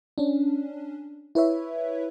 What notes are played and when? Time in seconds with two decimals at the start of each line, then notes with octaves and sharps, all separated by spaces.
0.18 C#4 D4
1.35 E4 B4 C#5 E5